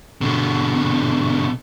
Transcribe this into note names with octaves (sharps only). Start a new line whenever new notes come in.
B2 D3